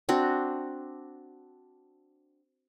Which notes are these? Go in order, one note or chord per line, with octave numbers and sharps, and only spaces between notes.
C4 D4 F#4